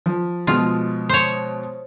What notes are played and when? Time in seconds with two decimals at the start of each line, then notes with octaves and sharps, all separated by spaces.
0.06 F3
0.47 B2 F3 G#3 F4
1.09 C5 C#5